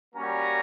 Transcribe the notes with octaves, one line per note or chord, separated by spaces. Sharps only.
G3 A#3 C#4 F#4 A#5